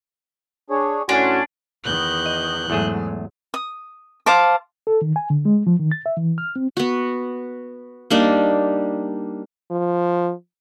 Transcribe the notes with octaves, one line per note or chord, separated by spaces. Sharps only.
D4 G#4 C#5
A2 C#4 D4 F#4 G#5 C6
E2 D#3 F#6 G6
D#5
E2 G#2 F#3 A3 G#4
D#6
C5 F5 A5 D6
A4
D#3
G#5
D3
G#3
F3
D#3
A6
E5
E3
F6
C4
B3 F#4
G3 A#3 D4 D#4
F3